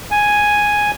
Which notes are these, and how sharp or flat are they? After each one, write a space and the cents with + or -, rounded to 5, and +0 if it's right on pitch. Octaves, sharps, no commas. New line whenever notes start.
G#5 +0